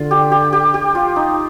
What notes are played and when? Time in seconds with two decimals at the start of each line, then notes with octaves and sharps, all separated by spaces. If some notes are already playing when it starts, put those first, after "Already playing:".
Already playing: D3 F4
0.11 G4
0.31 G4
0.53 G4
0.74 G4
0.95 F4
1.16 D#4